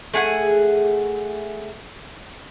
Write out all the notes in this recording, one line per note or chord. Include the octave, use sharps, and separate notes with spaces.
A3 G#4 F#5 G#5